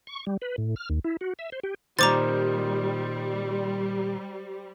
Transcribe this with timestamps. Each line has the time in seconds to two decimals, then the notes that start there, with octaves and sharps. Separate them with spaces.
0.07 C#6
0.27 G3
0.42 B4
0.58 A2
0.76 F6
0.90 D#2
1.04 E4
1.21 F#4
1.39 E5
1.52 C5
1.64 G4
1.99 A#2 D#3 G3 C5 A#5 D6 A6